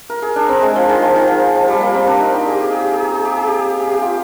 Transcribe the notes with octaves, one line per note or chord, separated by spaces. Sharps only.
A#4
G#4
D4
C4
G#3
F3
D#3
F3
D#3
F3
F3
G3
A#3
C4
D4
D#4
G4
G#4
G4
G#4
G4
G#4
G4
G#4
G4
G#4
G4
G#4
G4
F4